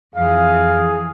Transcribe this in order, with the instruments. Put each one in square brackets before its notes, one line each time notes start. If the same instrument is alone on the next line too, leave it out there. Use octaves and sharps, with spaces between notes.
[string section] F2 E3 [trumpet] G#4 [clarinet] F5